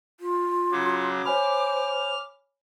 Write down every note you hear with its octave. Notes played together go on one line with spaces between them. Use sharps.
F4
C#3 F#3 D6
C5 C#5 G#5 B5 F6